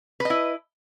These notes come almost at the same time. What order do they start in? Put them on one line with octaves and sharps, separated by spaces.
B4 D#5 E4